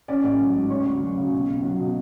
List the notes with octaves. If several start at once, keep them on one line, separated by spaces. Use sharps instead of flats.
C#4 D5 D6
A1
F#3
G#2
C#4 C#5 C#6
D2
F#3
C#3
B1
B1
F#3
B2